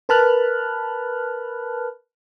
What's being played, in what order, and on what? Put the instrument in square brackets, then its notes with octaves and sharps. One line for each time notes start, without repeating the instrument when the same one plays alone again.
[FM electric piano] A#4 B4 A5 B5 F6 F#6